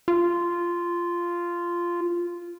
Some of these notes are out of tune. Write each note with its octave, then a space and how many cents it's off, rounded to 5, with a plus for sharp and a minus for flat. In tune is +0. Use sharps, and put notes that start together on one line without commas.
F4 -10